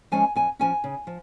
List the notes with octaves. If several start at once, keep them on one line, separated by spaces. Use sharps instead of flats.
F3 G#3 C#4 G#5
F2 G#5
F3 C#4 G#5
C#3
F3